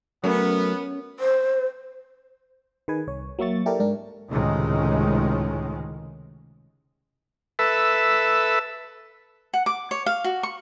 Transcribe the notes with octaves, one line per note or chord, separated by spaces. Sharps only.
F#3 A3 B3 C#4 A#4
C5
D#3 G#4 B4 G#5
C2 C#5
F#3 A#3 E5 C#6 A6
E4 G4 A4 A#4 D5
G#2 D4 A#4
C#2 A2 C3 D#3 G#3 C#4
A4 B4 E5
F#5
D6
C#5
F5
F#4
C#6